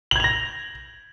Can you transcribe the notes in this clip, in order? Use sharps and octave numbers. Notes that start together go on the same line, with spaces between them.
G#6 A#6 F7 F#7